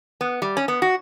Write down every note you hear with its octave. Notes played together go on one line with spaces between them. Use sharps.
B3
G3
C#4
B3
F#4